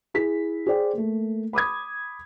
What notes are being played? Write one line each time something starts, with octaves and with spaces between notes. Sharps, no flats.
E4 G#4 B6
G#4 C5 D5 G5
A3 A#3
B5 D6 D#6 G#6